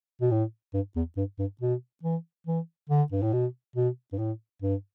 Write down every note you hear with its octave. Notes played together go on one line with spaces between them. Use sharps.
B2
A2
G2
E2
G2
G2
B2
E3
E3
D3
G2
A2
B2
B2
G2
A2
G2